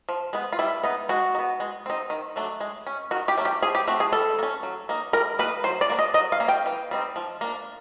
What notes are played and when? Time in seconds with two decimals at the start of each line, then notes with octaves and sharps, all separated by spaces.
0.09 F3
0.33 G#3 B3
0.53 F4
0.59 G3 E4
0.84 B3 D#4
1.09 G#3 F#4
1.35 D#4
1.39 B3
1.60 G#3
1.86 C4 D#4
2.10 D#3
2.36 F#3 A3 D4
2.60 G#3
2.87 C#4
3.11 D#3 F#4
3.28 G4
3.37 F#3 A3 C#4
3.45 G4
3.63 F3 G#4
3.75 G4
3.87 A3 C4 F#4
4.00 G#4
4.13 G3 A4
4.39 A#3
4.43 C#4
4.63 F#3
4.89 A#3 D#4
5.13 G3 A#4
5.39 A#3 B4
5.43 D#4
5.64 F#3 C5
5.81 D5
5.89 A#3 D4
5.99 D#5
6.14 F#3 D#5
6.32 F5
6.40 A#3 C#4
6.48 G5
6.66 E3
6.91 G3 C4 D#4
7.16 F3
7.41 A#3 D4